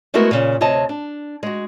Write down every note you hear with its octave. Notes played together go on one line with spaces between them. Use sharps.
G#3 A3 B3 E4 F#4 A#4
A#2 C#3
D2 C3 C#5 D#5 A5
D4
G#3 F#4